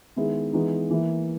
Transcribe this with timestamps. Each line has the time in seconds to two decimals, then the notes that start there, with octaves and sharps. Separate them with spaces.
0.16 D#3 G#3 B3 E4
0.53 E3 G#3 B3 D#4
0.91 E3 A#3 E4